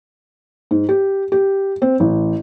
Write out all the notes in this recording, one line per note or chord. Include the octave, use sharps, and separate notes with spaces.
G#2
G4
G4
C4
A1